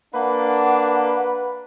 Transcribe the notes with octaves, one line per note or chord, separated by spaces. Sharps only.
A#3 D4 B4 F#5